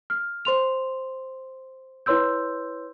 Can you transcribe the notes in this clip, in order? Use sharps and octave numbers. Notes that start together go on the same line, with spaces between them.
F6
C5 C6 F7
E4 B4 C#5 C6 E6 G6